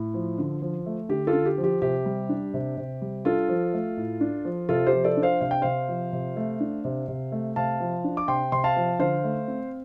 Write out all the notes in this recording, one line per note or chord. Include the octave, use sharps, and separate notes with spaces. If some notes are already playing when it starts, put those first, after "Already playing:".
Already playing: A2
F3
D3
F3
A3
D3 G4
F4 A4
D3
G4
F3
G4
C3 G4
G3
D4
C3
C3
G3
D4 F4 A4
F3
A3
A2
D4
F3
C3 F4 A4
G4 C5
F3
A4 D5
D4
C5 F5
C3 F5
G5
C3 C5 F5
F3
C3
A3
D4
C3
C3
A3
C3 F5 A5
F3
D4
D6
C3 G5 C6
C3 C6
F5 A5
F3
D3 C5 F5
A3
C4